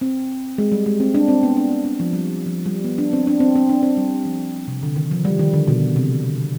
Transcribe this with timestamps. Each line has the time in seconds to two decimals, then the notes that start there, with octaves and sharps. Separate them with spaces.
0.01 C4
0.58 G#3
0.72 G3
0.86 G#3
1.00 C4
1.14 D4
1.28 C4
1.43 B3
1.57 D4
1.71 C4
1.85 D4
2.00 F3
2.13 G3
2.46 F3
2.66 G3
2.84 B3
2.98 D4
3.13 C4
3.27 D4
3.40 C4
3.56 C4
3.69 D4
3.83 C4
3.97 G3
4.25 F3
4.68 C3
4.83 D3
4.96 D#3
5.11 F3
5.25 G3
5.39 D#3
5.53 D3
5.68 B2
5.96 C3
6.23 D3
6.37 D3